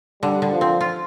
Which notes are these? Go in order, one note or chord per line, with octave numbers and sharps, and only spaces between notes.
D3 G3
D3
F3
C4
F4